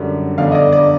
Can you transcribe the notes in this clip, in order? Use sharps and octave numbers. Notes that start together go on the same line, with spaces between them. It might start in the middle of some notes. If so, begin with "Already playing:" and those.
Already playing: F#2 D3 G3
G1 F2 D3 F5
D#5
D5
D5